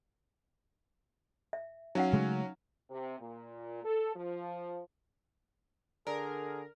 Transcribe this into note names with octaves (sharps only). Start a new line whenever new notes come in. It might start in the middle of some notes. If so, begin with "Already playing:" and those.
E5
F#3 C#4 D#4 F5 F#5
C#3 G#3 A3
C3
A#2
A4
F3
D3 G#4 A#4 D5